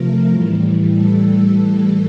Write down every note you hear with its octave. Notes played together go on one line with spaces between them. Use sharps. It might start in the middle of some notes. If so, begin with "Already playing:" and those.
Already playing: C3 F3 A3 A#4
A2 E3 G3
A4